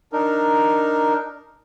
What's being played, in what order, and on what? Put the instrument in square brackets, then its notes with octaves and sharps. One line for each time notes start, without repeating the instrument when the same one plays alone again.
[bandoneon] D4 D#4 A#4